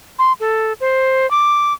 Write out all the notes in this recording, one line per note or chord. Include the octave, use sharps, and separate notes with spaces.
C6
A4
C5
D6